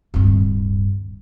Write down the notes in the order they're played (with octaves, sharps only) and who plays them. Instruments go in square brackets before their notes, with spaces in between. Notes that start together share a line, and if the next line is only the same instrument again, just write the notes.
[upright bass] D1 G2